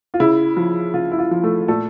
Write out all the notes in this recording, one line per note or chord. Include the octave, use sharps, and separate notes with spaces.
F4
C#3 E4
F3
C#3 F4
E4
F4
F3
A3 A4
A#2 A3 A4